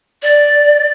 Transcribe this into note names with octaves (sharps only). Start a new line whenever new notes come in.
D5